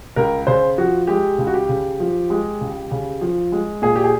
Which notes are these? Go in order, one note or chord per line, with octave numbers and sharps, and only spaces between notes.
C#2 A#4
C#3 C5
F3 F#4
G#3 G4
C#2
F#4
G4
C#3
F3
G#3
C#2
C#3
F3
G#3
A#2 G#4
G4
G#4